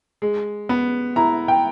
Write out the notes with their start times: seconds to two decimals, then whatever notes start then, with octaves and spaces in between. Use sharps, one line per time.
0.22 G#3
0.69 B3
1.16 E4 A#5
1.48 G5